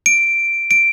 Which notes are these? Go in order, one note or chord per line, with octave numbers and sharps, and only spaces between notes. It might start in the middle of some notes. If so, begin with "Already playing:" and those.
D7
D7